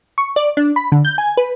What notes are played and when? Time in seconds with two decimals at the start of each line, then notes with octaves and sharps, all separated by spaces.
0.18 C#6
0.36 D5
0.57 D4
0.76 B5
0.92 D3
1.05 G6
1.18 G#5
1.37 B4